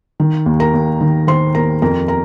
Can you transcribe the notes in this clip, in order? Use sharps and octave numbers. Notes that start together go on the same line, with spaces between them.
D#3
D#2
A#4 A#5
D#2
D#3
D#3 C5 C6
D#2 A#4 A#5
F2 A#4 A#5
A#4 A#5